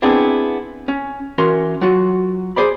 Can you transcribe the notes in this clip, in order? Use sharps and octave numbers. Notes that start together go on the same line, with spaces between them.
B3 C4 D4 E4 G#4
C#4
E3 C#4 F#4 A#4 C6
F#3 F4 F#4
G#4 C5 D5 B5